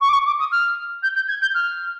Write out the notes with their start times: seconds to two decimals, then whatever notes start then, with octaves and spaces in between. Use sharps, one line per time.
0.01 C#6
0.08 D6
0.12 C#6
0.26 D6
0.39 D#6
0.51 F6
1.02 G6
1.15 G6
1.28 G#6
1.41 G6
1.54 F6